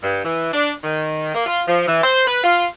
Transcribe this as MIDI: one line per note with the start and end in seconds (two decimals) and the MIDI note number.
0.03 0.23 43
0.24 0.50 52
0.53 0.72 62
0.84 1.31 51
1.34 1.43 58
1.46 1.61 65
1.68 1.85 53
1.87 2.03 52
2.03 2.25 72
2.27 2.43 71
2.44 2.66 65